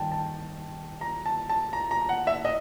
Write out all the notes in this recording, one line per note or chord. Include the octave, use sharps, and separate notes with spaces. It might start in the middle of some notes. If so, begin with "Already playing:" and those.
Already playing: G2 D#3 G5 A5
A5
A#5
A5
A5
A#5
A#5
F#5
E5
D#5